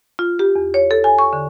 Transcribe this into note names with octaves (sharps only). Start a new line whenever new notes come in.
F4
G4
E2
C#5
A4
G#5
C#6
D3